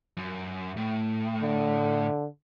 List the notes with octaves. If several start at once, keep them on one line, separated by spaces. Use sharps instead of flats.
F#2
A2
D3